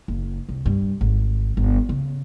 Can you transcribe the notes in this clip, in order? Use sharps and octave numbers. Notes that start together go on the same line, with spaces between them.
F#1
C2
G2
G#1
G1
C#3